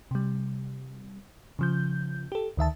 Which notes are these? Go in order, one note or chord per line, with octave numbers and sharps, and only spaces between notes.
C3 G3
C#3 F3 G6
G4 A4
D2 D#3 E5 A5